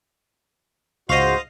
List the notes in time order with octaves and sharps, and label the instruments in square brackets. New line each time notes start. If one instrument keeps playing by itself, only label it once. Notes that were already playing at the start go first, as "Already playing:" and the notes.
[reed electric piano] C#2 C#6 [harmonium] G#2 F#4 [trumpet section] C5 [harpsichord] D#5 F5